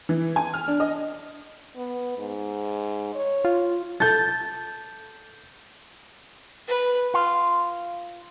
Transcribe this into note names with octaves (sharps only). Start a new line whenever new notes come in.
E3
G#5
F6
D4
D#5
B3
G#2
C#5
F4
A4 G6 A6
B4
F4